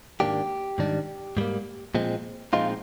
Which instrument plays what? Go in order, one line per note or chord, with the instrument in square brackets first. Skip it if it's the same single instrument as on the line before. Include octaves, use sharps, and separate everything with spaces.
[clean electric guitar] G#2 D#3 A#3 D4 G4
G#2 D#3 G3 D4
G#2 G3 A#3
A#2 F3 G#3 C4
A#2 F3 G#3 C4 D#4 F4